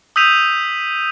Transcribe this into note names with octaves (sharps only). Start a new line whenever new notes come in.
D#6 E6 G6 B6 D#7 F7